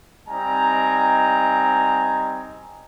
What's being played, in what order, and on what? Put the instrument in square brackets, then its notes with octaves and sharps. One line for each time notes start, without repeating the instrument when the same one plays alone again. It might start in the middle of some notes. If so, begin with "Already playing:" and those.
[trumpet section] G3 C4 D#4 D#5 G#5 A#5